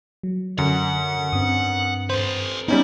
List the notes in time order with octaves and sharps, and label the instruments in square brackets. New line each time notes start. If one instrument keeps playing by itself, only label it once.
[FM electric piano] F#3
[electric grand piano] F#2 [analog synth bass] D3 [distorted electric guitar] F#5
[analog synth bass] G2 [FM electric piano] C4 D#6
[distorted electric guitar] A4 B4 [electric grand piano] C5
[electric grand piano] G3 C#4 D#4 [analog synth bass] B3 [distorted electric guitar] E4